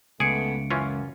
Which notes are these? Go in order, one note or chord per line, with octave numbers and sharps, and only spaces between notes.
C#2 A3 B3 G#4 C#7 D7
F#2 E3 C#4 F4